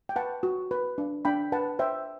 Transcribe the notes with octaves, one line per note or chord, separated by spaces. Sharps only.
G5
B4 F#5 A5
F#4
B4
D4
D4 G5 B5
B4 F#5 A5
C5 E5 G5